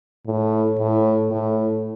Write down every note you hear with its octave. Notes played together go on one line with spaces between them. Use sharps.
A2
A2
A2